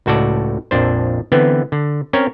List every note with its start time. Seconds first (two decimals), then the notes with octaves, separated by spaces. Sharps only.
0.06 C#2 A2 F#4 A4 D5
0.71 A#1 F2 D4 C5
1.32 D3 E3 B3 C4
1.72 D3
2.13 C4 C#4 A#4 C#5